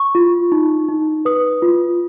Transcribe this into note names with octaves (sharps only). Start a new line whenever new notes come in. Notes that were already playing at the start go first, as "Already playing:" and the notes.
Already playing: C#6
F4
D#4
D#4
B4 D#6
F4